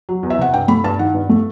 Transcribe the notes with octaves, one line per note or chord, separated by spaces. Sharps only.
F#3
E2
E5
C3 F#5
G2 G5
A3 B5
G2 A5
D#3 F#5
G2
A3